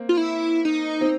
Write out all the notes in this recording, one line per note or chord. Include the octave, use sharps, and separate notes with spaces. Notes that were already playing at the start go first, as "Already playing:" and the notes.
Already playing: A#3 C4
F4
E4
D#4
C4